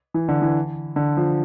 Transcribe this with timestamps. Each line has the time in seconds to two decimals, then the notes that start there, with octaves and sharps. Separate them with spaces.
0.14 E3
0.29 D3
0.42 E3
0.96 D3
1.17 F3